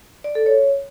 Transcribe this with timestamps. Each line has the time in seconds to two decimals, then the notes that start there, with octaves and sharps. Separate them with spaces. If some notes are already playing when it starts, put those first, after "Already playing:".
0.24 D5
0.35 A4
0.46 C#5